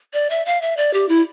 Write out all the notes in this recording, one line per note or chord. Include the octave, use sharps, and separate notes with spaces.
D5
E5
F5
E5
D5
G4
E4